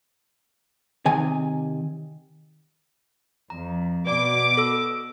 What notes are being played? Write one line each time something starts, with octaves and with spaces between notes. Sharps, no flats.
C3 D#3 G#5
F2 A#5
B2 D5 D6
A4 E6